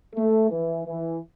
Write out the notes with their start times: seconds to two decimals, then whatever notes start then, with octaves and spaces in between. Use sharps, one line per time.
0.15 A3
0.50 E3
0.85 E3